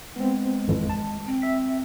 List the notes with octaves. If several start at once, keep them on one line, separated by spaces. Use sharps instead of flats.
G#3 B3 C4
G#1 F2 E3
A5
C4
E5 B6